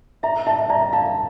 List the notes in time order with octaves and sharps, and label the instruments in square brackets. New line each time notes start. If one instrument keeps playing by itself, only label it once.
[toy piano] E5 [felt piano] A#5
[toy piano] E5 [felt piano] A5
[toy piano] D5 [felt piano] A#5
[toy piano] F5 [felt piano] A5